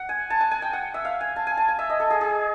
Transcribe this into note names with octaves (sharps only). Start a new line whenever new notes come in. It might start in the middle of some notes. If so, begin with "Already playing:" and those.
Already playing: F#5
G#5
A5
G#5
G#5
G5
F#5
E5
F5
G#5
A5
G#5
A5
G#5
E5
D#5
A4
G#4
G#4